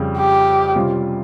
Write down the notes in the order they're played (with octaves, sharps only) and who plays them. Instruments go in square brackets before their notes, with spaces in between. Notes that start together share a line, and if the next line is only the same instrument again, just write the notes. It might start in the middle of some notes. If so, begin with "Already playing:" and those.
Already playing: [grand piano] F2 C#3 G3
[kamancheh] G4
[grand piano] C3 G3 C#4 F4